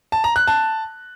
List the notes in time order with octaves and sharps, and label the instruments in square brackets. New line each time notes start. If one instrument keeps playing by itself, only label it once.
[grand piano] A5
A#5
F#6
A5